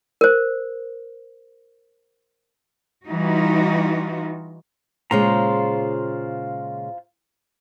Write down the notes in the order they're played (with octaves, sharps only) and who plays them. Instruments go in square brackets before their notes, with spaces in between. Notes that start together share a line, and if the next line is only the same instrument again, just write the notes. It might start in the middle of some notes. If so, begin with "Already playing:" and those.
[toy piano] A#4 C5
[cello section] E3 G3 D#4 F4 F#4
[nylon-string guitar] A#2 C#3 G#3 [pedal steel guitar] F4 C5 A#5